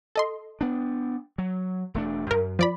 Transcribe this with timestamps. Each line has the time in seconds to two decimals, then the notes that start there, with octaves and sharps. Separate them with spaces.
0.15 A4 D#5 C6
0.61 B3 D4
1.38 F#3
1.94 E1 A3 D4
2.31 F#2 A#4
2.59 F3 D5 B5